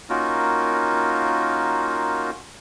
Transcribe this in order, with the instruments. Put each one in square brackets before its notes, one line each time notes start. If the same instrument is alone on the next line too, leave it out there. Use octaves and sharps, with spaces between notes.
[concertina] A#3 C#4 D#4 F4 F#4 A#4